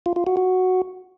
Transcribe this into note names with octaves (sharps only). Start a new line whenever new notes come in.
F4
F4
F#4
F#4